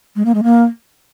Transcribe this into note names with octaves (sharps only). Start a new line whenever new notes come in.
G#3
A#3
G#3
A#3